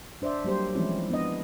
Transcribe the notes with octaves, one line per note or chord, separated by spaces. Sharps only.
D4 C5 D5 E5
F#3 G3 A#3 G4 C5
E3 F3 G#3 C4 C#4 E4
B3 D4 D#5